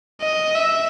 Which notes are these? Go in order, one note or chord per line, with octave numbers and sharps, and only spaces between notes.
D#5
E5